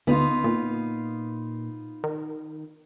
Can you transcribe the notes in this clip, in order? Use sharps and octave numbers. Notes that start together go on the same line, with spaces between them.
D2 B3 D#4 F4
A#2
D#3